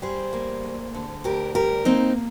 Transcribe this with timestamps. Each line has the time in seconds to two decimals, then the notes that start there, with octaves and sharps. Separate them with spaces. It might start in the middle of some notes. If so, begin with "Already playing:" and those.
0.02 G3 G#4 C5
0.33 A#3
0.63 D2
0.94 D3
1.24 D2 G4 A#4
1.55 G3 G4 A#4
1.85 A#3 C4 D#4